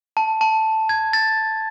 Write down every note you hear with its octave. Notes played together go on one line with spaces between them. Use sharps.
A5
A5
G#6
A6